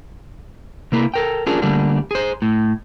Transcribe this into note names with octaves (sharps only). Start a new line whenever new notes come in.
C3 A#3 E4
A4 A#4 G5
C#4 D4 F4 G#4 A#4
D3 G3 A3 A#3 D4
G#4 C5
A2